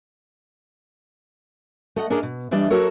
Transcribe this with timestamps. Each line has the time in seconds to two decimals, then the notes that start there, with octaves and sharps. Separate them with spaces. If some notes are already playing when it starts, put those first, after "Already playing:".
1.96 A3 D#5 F#5
2.10 C#4 D4 G#4 A#4 D5 D#5
2.23 B2
2.51 E3 G3 D4 D5 D#5
2.70 F#3 F#4 A4 A#4 C#5